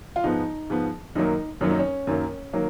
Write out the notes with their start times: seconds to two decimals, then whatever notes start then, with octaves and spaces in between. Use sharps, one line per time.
0.16 F4
0.24 G#2 F3 B3 D#4
0.70 G#2 F3 B3
1.15 F#2 D#3 F#3 A#3 D#4
1.61 F#2 D#3 F#3 A#3 C#4
1.71 D#4
1.79 C#4
2.07 F#2 D#3 F#3 A#3
2.53 D#3 F#3 A#3